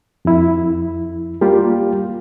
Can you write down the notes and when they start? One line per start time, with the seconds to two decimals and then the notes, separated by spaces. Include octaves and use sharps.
0.25 F2 E4
1.41 G3 A#3 F4 G4